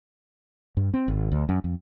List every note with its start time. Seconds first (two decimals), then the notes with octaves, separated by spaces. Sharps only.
0.77 G2
0.94 C4
1.08 G#1
1.32 D2
1.49 F#2
1.64 F2